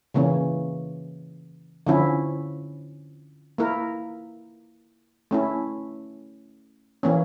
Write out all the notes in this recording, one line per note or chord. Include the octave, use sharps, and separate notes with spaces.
C#3 E3 A#3 C#4
D3 F3 C#4 E4
A#3 E4 A#4
A3 C#4 E4
E3 A#3 C#4